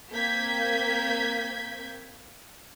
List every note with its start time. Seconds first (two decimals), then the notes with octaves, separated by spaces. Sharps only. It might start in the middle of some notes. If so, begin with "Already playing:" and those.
0.13 A#3 C4 G6 G#6 B6